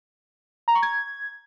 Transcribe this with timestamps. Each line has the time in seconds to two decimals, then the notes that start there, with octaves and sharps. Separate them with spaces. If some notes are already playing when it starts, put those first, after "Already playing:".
0.68 A#5
0.75 C#6
0.82 G#6